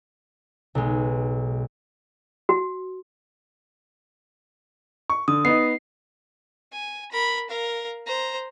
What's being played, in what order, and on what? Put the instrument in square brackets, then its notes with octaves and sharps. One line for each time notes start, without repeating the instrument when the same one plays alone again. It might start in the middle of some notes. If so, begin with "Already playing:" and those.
[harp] B1 G#3
[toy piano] F#4
[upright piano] C#6
[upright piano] D3 [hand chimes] D#6
[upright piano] B3 D#4 D#5 [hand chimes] C7
[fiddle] G#5
A#4 B5
A#4 F5
C5 A#5